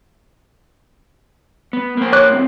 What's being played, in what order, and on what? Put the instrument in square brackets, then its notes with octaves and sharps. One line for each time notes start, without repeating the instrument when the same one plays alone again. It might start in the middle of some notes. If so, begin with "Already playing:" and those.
[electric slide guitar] B3
A#3 C5
[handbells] C#5 D6 F#6
[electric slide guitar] A2 C4